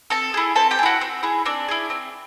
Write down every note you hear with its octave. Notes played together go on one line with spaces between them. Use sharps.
C4 A4 A5
E4 G#4
C4 A4 A5
G4 G5
G#4
E4 F#4 F#5
C4
E4 G#4
C4 D4 D5
E4 G#4
C4